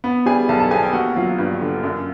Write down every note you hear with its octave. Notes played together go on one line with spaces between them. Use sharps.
B3
G3 G#4 G#5
B1 A4 A5
A4 A5
B2 G#4 G#5
G4 G5
A#3 F#4 F#5
F#3 F4 F5
G2
D3
F#2